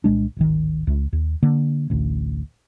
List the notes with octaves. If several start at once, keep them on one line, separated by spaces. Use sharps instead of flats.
C2 A#2 G#3 D4
D1 G#1 D#3
C#2
D#2
D3 A#3
A1 D2